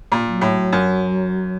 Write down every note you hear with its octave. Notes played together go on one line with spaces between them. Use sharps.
A#2
F#3
A2
F#2